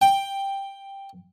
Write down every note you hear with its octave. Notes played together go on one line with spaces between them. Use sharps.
G5